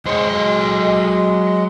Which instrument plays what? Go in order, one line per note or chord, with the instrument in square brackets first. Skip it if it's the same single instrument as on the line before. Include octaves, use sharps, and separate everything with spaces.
[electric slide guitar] F2 C5 C#5 [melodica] G#3
[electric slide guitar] F#3 D#5